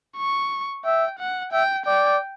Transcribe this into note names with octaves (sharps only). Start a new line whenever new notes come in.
C#6
E5 G5
F#5
E5 G5
D5 G5